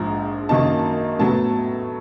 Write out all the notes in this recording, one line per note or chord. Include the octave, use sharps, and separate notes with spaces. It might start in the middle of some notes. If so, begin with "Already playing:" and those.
Already playing: A#1 G#2 F3 A#5
F#2 D#3 F#3 A#3 D#4 A5
A2 F#3 B3 A5